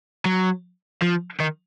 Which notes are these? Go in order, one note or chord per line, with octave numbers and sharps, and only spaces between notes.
F#3
F3
D#3